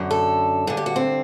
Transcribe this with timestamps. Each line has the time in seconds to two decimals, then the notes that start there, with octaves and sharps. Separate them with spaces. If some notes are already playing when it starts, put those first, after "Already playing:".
Already playing: F#2 D3
0.11 A4
0.67 G2 D3 G#4
0.77 G4
0.86 F#4
0.96 C4